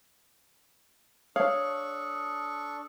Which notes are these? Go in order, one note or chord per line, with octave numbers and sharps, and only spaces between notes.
D4 A4 C#5 F5 C#6 D#6